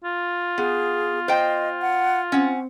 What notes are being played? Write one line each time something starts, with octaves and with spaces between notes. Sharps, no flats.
F4
B3 G#4
C5 D#5 G5
F#5
C4 C#4 F#5